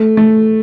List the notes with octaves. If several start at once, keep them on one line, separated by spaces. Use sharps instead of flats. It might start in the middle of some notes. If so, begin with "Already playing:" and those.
Already playing: A3
A3